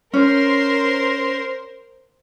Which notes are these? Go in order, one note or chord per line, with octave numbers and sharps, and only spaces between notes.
C#4 A#4 C5 C6